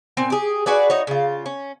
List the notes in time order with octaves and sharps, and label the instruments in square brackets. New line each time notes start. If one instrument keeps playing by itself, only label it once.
[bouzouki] A#2 C4 G#5
G4 G#4
F#4 G#4 B4 D5
D#4 F#4 C#5
C#3 F4
C#4